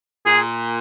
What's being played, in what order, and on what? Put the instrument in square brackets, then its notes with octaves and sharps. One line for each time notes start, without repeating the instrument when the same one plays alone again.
[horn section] A#2 [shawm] G#4